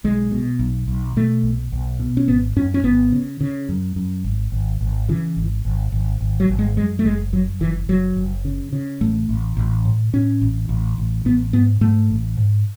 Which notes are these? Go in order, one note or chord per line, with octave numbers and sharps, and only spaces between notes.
B1 G#3
B2
B1
B1
B2 A3
B1
B1
B2
C#4
G#1 B3
F#2 C#4
C#4
G#1 B3
C#3
C#3
F#2
F#2
G#1
G#1
G#1
C#3 E3
G#1
G#1
G#1
G#1
F#3
G#1
G#3
F#2 G#3
A3
F#1 G#3
F#2 F#3
F#1 E3
F#1 F#3
F#1
C#3
C#3
A1 A3
A1
A1
A2
A2 C#4
A1
A1
A1
A1 B3
G#2 B3
G#2 A3
A1
G#2